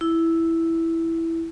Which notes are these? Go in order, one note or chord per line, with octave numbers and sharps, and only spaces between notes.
E4